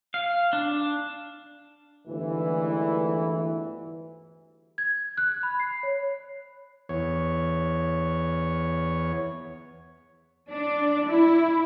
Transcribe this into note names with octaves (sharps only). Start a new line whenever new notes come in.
F5
D4
G1 D2 G#2 E3
G#6
F#6
B5
C7
C#5
E2 C#5
D4
E4